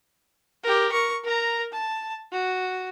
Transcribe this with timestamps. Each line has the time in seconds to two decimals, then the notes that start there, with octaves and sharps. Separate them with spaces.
0.64 G4 A#4
0.92 A#4 C#6
1.24 A#4 A#5
1.72 A5
2.32 F#4